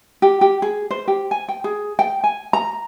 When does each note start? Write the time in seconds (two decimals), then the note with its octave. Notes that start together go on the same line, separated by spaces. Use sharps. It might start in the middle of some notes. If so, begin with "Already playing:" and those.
0.22 G4
0.41 G4
0.62 G#4
0.91 C5
1.08 G4
1.31 G#5
1.49 G5
1.64 G#4
1.99 G5
2.24 G#5
2.53 A#5